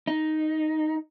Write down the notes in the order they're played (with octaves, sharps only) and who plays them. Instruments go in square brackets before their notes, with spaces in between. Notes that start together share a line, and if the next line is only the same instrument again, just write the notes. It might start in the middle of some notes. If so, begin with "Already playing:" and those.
[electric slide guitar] D#4